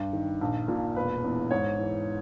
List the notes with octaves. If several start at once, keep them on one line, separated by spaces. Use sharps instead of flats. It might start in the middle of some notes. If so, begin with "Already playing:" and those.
Already playing: G2
D#3
A#1
A#2
E1 B4
E2
G#2 C#5
E3